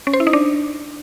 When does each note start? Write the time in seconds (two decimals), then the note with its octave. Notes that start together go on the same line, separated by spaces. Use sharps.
0.07 C#4
0.13 C5
0.20 E4
0.27 D#4
0.33 D4